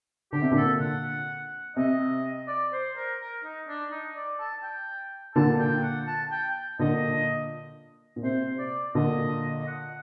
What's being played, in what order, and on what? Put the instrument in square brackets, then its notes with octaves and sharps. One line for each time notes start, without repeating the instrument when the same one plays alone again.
[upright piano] D3 [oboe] G4
[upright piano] C3
A#2 D3
[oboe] A4
F#5
[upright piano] C3 [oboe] D#5
[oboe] D5
C5
A#4
A#4
D#4
D4
D#4
D5
A5
G5
[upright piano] A#2 D3 [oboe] A5
[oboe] G5
F#5
A5
G5
[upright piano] A#2 D3 [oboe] D#5
[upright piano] A#2
[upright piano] C3 [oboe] C5
[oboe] D5
[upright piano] A#2 D3 [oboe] D#5
[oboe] D#5
F#5